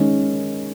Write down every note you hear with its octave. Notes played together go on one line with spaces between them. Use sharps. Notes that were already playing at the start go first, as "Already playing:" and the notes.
Already playing: D#3 G#3 C#4